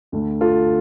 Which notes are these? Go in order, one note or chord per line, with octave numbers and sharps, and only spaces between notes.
D2 D3 A3
F4 A4